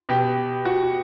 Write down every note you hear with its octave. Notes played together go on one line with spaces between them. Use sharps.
B2 G4
F#4